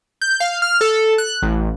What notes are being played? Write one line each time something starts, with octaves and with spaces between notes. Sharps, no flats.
G6
F5
F6
A4
F#6
A1